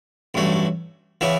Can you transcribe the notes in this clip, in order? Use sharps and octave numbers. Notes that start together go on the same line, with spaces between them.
A1 G2 F#3 A3
C#3 E3 B3 E4